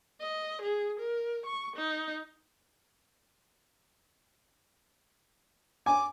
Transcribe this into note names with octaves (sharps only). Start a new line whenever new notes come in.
D#5
G#4
A#4
C#6
D#4
G#5 D6